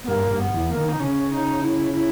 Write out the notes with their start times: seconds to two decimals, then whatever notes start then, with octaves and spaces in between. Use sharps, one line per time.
0.04 B3
0.08 G2 A#3
0.31 G2
0.38 B3
0.54 E2
0.69 A#3
0.77 D#3
0.89 D#4
1.00 C#3 C#4
1.31 D#4
1.61 E4
1.92 E4